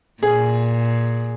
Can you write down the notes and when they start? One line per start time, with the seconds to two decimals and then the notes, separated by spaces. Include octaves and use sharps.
0.23 A#2 G#4